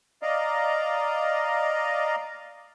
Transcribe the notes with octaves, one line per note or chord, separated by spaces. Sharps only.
D5 D#5 F5 A#5